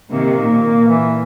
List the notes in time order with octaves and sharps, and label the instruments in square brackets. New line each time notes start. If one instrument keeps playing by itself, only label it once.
[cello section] C3 D#3 [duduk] A#3
[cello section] A#2
[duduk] E3